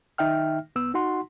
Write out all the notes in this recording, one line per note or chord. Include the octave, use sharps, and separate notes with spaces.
D#3 D#4 E5 G5 F6
C2 B3 E6
D#4 F#4 F#5 C6